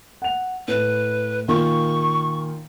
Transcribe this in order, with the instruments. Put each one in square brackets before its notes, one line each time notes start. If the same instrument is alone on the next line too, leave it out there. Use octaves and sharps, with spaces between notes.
[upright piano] F#5 F7
[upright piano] A2 [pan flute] B4
[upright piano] A#2 D#3 F4 [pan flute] C#6